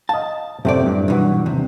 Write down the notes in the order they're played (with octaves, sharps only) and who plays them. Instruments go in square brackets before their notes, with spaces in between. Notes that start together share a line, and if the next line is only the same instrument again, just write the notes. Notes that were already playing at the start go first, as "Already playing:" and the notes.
[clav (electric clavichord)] D#5 F5 [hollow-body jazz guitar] A5
[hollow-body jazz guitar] F#2 A2 D5 [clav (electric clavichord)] C3 A3 C4
[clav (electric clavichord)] G2
[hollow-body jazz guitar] B1 E3 [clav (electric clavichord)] G2 F#4
[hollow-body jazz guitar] D#2 C3